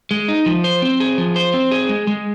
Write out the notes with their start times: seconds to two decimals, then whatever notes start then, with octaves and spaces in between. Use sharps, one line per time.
0.11 G#3
0.28 D#4
0.46 F3
0.64 C5
0.82 C4
1.00 G#4
1.18 F3
1.36 C5
1.54 C4
1.71 G#4
1.89 G#3
2.07 G#3